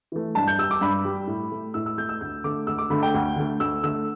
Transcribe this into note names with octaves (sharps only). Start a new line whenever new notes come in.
E3 A3
G2 A5
G6
G3 E6
D6
G2 B5
G3
A2
A3
A2 E6
E6
A3 G6
E6
D2 G6
D3 A3 D6
D2 E6
D6
D3 A3 B5
G5
D2
D3 A3
D2 E6
D3 A3 E6